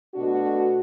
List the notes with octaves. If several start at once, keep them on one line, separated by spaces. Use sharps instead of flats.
B2 A3 D4 F#4